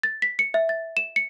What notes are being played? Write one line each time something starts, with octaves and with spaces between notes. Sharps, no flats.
A6
B6
C#7
E5
A6
E7
C#7